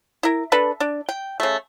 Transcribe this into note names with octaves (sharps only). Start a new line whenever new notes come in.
E4 A#4
D4 A4 B4
D4
G5
C#3 A3